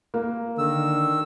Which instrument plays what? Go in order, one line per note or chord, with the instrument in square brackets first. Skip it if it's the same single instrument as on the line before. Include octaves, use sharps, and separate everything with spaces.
[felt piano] A#3
[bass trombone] D3 [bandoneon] D#3 E6